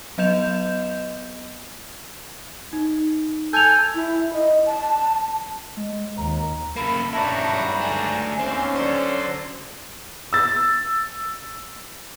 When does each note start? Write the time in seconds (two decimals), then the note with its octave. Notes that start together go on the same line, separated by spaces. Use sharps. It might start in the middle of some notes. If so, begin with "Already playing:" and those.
0.18 F#3 B3 D#5 G6 E7 F7
2.73 D#4
3.53 A4 G#5 G6 F7
3.95 E4
4.33 D#5
4.66 A5
5.77 G#3
6.17 D#2 A#5
6.76 C#3 A#3 A4 B5
7.13 C2 G2 C#4 D4 E4 F#4 A5 A#5
7.47 G#2 F#3 G3 B5
7.81 A3 D4 G#5
8.39 D#2 C4 C#4
8.76 D3 F#3 A4 C5 D5
10.33 E6 A6